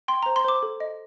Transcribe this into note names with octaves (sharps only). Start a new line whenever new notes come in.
G5 C6
A#5
C5
C6
C5 D6
A4
D#5